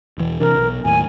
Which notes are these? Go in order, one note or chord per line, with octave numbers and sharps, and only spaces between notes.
E1 E3
C3 E3 D4 A#4
B1
D#2 A2 G#5